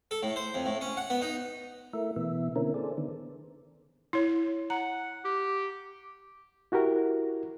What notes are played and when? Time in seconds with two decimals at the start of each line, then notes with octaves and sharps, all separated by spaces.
0.11 A4
0.23 A2
0.36 C5
0.54 F2
0.66 A2
0.81 C#4
0.97 F#5
1.10 B3
1.22 D#4
1.93 A3 E4 A#4 E5
2.16 B2 E3 B3 E5
2.56 D3 A#3 C4 C#4 E4 A#4
2.74 G#4 A4 C5 D5
2.98 D3 D#3 B3
4.13 E4 C#5
4.70 F#5 A#5
5.25 G4
6.72 E4 F#4 G4 A#4